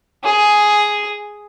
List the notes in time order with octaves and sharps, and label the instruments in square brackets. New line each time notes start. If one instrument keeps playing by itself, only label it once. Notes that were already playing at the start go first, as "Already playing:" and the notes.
[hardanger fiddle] G#4